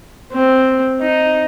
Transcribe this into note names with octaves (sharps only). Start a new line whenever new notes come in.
C4
D#4